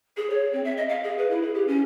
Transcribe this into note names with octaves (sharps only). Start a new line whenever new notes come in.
G#4
C#5
C4
E5
D#5
F5
G#4
B4
E4
G#4
G4
C#4